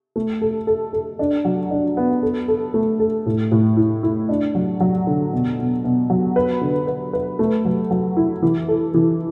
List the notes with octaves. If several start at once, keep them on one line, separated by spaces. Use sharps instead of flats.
A3
A4
A4
A4
D4
F#3
D4
B3
A4
A4
A3
A4
A2
A2
E4
E4
D4
F#3
F#3
D3
B2
B2
B2
F#3
B4
D3
B4
B4
A3
F#3
F#3
E4
E3
A4
E3